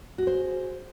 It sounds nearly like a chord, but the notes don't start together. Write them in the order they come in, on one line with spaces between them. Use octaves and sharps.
F#4 G#4 C5